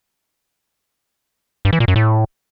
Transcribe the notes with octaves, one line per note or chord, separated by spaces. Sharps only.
G2
E3
A#2
F#2
A2